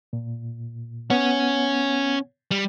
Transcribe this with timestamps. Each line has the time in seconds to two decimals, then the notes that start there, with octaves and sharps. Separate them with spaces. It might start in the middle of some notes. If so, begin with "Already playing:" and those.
0.13 A#2
1.10 B3 C#4 F#5
2.51 G3